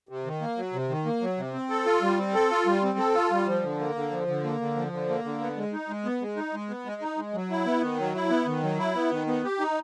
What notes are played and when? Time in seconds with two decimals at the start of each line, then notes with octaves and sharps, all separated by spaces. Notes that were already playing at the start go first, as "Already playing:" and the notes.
0.09 C3
0.25 D#3
0.41 A#3
0.57 F#3
0.73 C3
0.89 D#3
1.05 A#3
1.21 F#3
1.37 C3
1.54 C4
1.70 A4
1.86 F4
2.02 G3
2.18 C4
2.34 A4
2.51 F4
2.66 G3
2.83 C4
2.99 A4
3.15 F4
3.31 G3
3.47 F3
3.63 D3
3.79 A#3
3.95 D3
4.12 F3
4.28 D3
4.44 A#3
4.60 D3
4.76 F3
4.92 D3
5.09 A#3
5.24 D3
5.40 B3
5.57 G#3
5.73 D#4
5.89 G#3
6.05 B3
6.21 G#3
6.37 D#4
6.53 G#3
6.70 B3
6.85 G#3
7.02 D#4
7.18 G#3
7.34 F#3
7.50 E4
7.66 B3
7.82 D#3
7.99 F#3
8.15 E4
8.30 B3
8.46 D#3
8.63 F#3
8.79 E4
8.95 B3
9.11 D#3
9.27 B3
9.44 G4
9.60 D#4